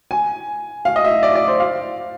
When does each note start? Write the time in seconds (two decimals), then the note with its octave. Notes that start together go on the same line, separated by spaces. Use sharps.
0.11 G#5
0.85 F5
0.96 D#5
1.04 E5
1.23 D5
1.35 D5
1.48 C5
1.60 F5